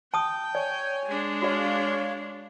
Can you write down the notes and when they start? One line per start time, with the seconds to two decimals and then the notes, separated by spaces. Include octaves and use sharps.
0.14 G5 A5 D#6
0.55 C#5 D5 G#5
1.07 G#3 D4
1.42 F#4 C#5 D5 F5